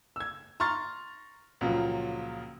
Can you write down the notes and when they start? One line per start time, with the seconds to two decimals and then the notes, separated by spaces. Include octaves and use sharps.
0.16 E6 G#6
0.60 A#5 C6 C#6 F6 A6
1.61 C#2 A#2 C#3 F3 F#3